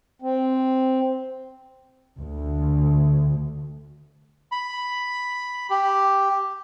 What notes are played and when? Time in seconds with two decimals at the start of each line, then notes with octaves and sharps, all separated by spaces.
0.22 C4
2.20 D2
4.52 B5
5.70 G4